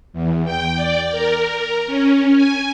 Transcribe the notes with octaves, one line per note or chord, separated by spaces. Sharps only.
E2
G5
D5
A#4
A#4
C#4
G#5